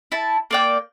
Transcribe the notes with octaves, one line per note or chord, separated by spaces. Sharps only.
E4 A5
A#3 D5 G5